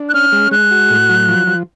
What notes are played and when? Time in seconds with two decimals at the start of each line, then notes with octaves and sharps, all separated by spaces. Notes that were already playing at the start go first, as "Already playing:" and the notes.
Already playing: D4
0.09 F#6
0.14 C#4 F6
0.32 G#3
0.51 G#3 F#6
0.71 F#4
0.90 A2
1.09 F#3
1.29 F3
1.47 F3